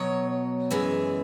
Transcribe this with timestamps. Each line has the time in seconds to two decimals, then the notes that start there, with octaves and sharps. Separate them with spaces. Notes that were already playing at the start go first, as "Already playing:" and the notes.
Already playing: B2 F#3 C#5
0.71 F#2 E3 G#3